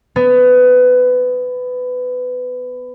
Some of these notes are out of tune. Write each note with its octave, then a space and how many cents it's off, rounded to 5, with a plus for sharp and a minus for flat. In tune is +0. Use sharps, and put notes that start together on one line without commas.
B3 +20